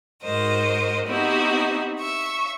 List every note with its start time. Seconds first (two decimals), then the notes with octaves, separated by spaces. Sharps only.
0.22 G#2 F#4 A#4 C5 D#5
1.07 B3 C4 D#4 E4 F#4 G4
1.98 E5 C#6